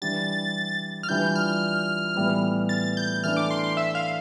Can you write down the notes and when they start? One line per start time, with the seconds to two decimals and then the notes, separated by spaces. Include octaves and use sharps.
0.02 E3 G3 D4 G4 A6
1.03 F6
1.09 E3 G3 D4 F4 G6
1.36 F6
2.16 A2 E3 G3 B3
2.69 A6
2.97 G6
3.24 E3 A3 D4 F6
3.37 D6
3.51 C6
3.64 C6
3.77 E5
3.95 F5